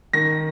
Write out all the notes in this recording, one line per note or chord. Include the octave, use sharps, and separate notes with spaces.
D#3 A#6